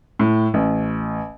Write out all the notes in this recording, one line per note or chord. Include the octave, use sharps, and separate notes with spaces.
A2
A1